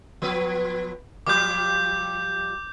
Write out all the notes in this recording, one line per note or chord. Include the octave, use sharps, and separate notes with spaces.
F3 B3 B4
F3 G3 A#3 D6 G6